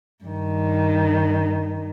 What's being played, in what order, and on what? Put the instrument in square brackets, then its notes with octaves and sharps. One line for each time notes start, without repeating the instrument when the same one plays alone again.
[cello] G2 D#3